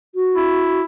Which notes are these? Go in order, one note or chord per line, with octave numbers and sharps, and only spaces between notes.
F#4
E4